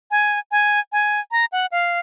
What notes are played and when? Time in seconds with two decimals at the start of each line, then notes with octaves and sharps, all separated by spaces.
0.11 G#5
0.51 G#5
0.92 G#5
1.31 A#5
1.52 F#5
1.72 F5